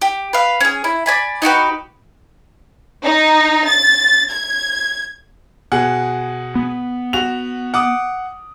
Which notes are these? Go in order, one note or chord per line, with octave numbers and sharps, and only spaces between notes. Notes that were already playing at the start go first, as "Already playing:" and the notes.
G4
B4 F5
C#4 G#4
E4
D5 G#5 B5
D#4 F#4 G4 B4
D#4
A6
G#6
B2 G#4 F#5
B3
F#4 F7
F#5 D6 D#6